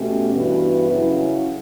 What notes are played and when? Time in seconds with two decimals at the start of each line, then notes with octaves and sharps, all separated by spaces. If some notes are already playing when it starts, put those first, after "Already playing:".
Already playing: B2 A3 C#4 G4
0.32 G2 E3 B3 F#4 B4
0.89 C#3 F#3 C#4 E4